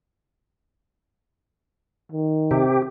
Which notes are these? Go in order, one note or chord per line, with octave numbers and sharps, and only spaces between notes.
D#3
C3 G4